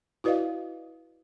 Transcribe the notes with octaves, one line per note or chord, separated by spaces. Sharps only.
E4 F#4 B4 D5 D#5 F5